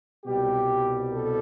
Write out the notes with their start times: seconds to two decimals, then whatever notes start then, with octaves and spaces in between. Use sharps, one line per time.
0.25 C2 B2 G3 G4
1.11 A4